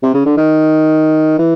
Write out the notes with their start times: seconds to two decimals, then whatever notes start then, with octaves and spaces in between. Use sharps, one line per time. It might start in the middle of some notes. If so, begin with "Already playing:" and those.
0.03 C3
0.14 C#3
0.25 D3
0.37 D#3
1.39 E3